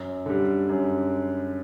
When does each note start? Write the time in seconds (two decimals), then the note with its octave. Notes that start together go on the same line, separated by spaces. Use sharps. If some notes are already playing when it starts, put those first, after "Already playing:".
Already playing: F#2
0.26 D3 G3
0.69 F#2